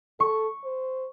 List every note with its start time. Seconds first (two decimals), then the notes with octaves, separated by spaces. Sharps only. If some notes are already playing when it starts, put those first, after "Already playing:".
0.20 A4 C#6
0.64 C5